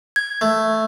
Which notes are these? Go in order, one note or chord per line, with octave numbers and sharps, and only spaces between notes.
G#6
A3